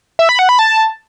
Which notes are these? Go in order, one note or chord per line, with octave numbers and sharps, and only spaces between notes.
E5
B5
F#5
B5
A5